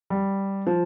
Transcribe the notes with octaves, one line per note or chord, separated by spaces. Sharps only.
G3
F3